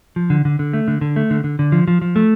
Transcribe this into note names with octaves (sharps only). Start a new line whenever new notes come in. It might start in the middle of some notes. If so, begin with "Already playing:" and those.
F3
D3
D3
D3
A3
D3
D3
A3
D3
D3
D3
F3
F3
F3
A3